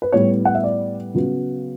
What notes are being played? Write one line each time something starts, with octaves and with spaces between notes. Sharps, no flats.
B4
A2 G3 B3 C#5
F#5
E5
D5
C#3 F#3 B3